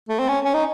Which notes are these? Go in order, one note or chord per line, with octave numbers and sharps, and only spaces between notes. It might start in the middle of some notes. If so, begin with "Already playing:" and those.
A3
C4
C#4
C#4
D#4